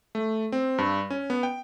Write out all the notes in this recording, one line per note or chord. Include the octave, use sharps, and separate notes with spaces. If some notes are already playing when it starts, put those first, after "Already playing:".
A3
C4
G2
C#4
B3
G5